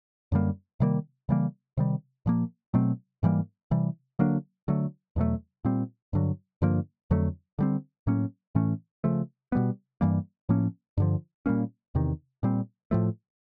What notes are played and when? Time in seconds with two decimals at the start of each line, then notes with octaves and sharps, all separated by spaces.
0.32 F#2 D3 G3 A#3
0.80 C3 D#3 G3 A#3
1.29 C#3 E3 G3 A#3
1.77 C3 D#3 G3
2.26 A#2 F3 A#3
2.74 B2 F#3 A3 C4
3.23 G#2 E3 G3 A#3
3.71 C3 E3 G3
4.19 D3 F#3 A#3 D4
4.68 D3 F#3 A3
5.16 E2 B2 F#3 A3
5.65 A#2 G3 C4
6.13 G2 D3 F#3
6.62 G2 D3 F3 A#3
7.11 F2 D3 F#3 A3
7.59 D3 G3 C4
8.07 A2 F#3 A#3 C#4
8.55 A2 E3 A3 C#4
9.04 C#3 F3 A3
9.52 B2 G3 B3
10.01 G2 E3 G3 A#3
10.49 A2 F3 A#3 C#4
10.98 G2 D3 F3
11.46 A#2 G3 A#3 C#4
11.95 E2 C3 D#3
12.43 A#2 G3 C4
12.91 A2 F3 A3